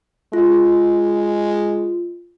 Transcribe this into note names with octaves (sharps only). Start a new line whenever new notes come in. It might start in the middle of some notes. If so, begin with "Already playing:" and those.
G#3 F4